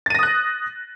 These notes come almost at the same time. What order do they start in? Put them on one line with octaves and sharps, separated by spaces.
A6 D#7 A#6 D#6 F#6